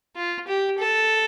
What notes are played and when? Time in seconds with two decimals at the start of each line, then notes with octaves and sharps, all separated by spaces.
0.16 F4
0.47 G4
0.79 A4